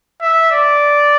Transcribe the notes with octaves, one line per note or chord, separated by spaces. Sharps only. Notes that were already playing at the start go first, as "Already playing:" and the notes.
E5
D5